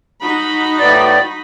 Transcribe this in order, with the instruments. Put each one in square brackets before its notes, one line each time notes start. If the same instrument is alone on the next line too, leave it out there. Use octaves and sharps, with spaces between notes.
[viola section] D#4 F#4 B5
[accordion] A2 B3 D5